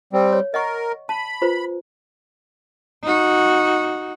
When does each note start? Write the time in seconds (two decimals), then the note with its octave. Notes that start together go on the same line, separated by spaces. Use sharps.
0.13 G3 C4
0.33 C#5
0.54 A#4 D#5 F#5 C#6
1.09 A5 B5
1.42 F4 B4 C5
3.04 D#4 F#4